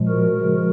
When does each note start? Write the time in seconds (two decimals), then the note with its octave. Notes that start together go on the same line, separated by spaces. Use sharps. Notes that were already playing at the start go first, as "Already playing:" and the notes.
Already playing: A#2 F3 G#3
0.08 F#4 A#4
0.40 C#3 F3 G#3